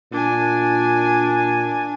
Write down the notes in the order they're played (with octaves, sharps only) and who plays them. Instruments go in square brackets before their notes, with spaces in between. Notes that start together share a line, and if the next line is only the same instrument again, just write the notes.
[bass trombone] A#2 [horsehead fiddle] D4 G#5